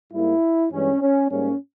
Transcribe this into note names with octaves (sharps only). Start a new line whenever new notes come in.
G#2 G3 A#3 E4
G2 E3 G#3 C#4
C#4
G#2 G3 A#3 C#4